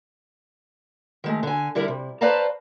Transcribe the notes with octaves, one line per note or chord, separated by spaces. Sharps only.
D#3 G#3 A3
D3 G#5
D3 G3 E4 A#4
C3
B4 C5 D5 F5 A5 A#5